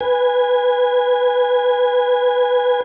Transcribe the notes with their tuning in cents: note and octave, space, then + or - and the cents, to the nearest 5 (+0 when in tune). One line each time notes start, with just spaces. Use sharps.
B4 +0 G#5 -15